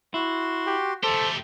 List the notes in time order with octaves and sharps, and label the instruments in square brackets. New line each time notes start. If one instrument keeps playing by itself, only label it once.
[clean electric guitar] E4 [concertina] F#4 C6
[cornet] G4
[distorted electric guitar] A3 G4 [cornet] A4 [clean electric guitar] C5